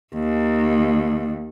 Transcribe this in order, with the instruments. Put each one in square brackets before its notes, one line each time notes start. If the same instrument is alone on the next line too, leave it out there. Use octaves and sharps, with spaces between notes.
[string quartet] D#2